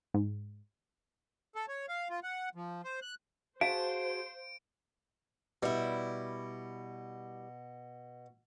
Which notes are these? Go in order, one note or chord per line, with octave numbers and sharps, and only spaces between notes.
G#2
A4
C#5
F5
F4
F#5
F3
C5
F#6
F#4 G#4 C5 F5 A5 D7
B2 G3 E4